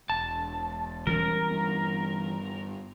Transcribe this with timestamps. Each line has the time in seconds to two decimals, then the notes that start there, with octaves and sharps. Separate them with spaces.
0.10 E1 A5
1.07 E3 G3 C#4 A#4
1.50 G2 B3